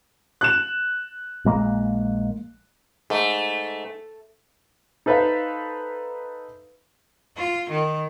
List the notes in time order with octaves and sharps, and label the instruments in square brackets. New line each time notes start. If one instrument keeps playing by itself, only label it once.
[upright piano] F#6 E7
[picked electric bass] A#1 G#3 A#3
[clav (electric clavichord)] G#2 [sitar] A3
[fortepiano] D#4 A4 B4 C5 E5 F5
[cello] F4
D#3